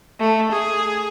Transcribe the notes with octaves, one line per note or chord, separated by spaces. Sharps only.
A3
G#4